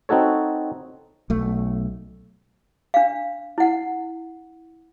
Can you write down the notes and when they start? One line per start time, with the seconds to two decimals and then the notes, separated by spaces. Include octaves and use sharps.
0.09 C4 D#4 F#4 A4 C#5
1.30 B1 A3
2.94 D4 F5
3.58 E4 F#5